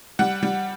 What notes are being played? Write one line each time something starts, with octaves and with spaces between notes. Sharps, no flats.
G3 F#5
G3